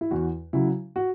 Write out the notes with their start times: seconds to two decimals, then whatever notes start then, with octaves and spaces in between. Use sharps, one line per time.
0.01 E4
0.11 E2 F#4
0.53 C#3 F#3 E4
0.96 F#4